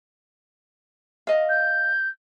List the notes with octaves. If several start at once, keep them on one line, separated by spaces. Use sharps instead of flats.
D#5 F5
G6